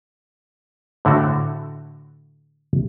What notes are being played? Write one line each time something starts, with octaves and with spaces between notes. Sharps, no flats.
A2 D3 A3 F#4